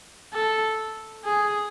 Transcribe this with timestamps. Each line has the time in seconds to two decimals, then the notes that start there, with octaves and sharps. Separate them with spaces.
0.34 A4
1.25 G#4